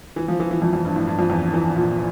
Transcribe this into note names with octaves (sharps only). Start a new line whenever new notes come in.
E3
F3
E3
E3
F2
F2
G2
A2
G2
F2
E2
E3
A#2